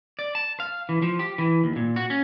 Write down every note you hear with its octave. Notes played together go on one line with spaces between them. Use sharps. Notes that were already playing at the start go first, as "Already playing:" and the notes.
D5
A5
F5
E3
F3
G4
E3
D#2
A#2
F#4
C#4